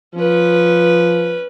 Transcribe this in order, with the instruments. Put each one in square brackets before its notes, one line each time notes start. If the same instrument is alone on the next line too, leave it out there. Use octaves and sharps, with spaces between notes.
[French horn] F3 [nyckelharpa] C#4 B4